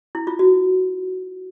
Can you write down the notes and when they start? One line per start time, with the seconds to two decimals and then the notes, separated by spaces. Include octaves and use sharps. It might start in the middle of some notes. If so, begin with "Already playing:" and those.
0.15 E4
0.27 F4
0.39 F#4